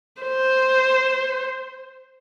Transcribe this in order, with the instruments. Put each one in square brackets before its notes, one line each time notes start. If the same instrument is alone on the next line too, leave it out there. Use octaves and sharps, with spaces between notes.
[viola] C5